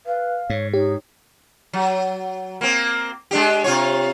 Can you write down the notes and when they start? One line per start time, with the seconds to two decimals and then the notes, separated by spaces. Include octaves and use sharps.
0.06 B4 F5
0.50 G#2 C#5
0.74 D#4 G4 C#5
1.73 F#3
2.61 A#3 C4
3.31 G#3 D4 G4
3.64 C3 F4 C#5